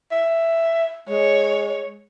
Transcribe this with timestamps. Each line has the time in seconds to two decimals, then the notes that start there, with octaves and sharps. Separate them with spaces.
0.12 E5
1.09 G#3 C#5